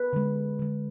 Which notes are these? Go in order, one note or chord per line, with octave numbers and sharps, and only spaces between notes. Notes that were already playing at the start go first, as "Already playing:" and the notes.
Already playing: B4
D3 G#3
D3 G#3